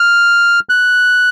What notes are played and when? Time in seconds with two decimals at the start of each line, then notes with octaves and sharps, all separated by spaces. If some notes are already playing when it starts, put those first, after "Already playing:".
Already playing: F6
0.69 F#6